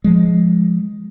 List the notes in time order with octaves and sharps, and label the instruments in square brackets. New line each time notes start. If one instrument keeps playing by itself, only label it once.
[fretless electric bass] F3 G#3